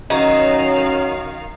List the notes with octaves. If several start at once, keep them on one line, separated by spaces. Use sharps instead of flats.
D#3 F#3 C#4 D#4 D#5 F5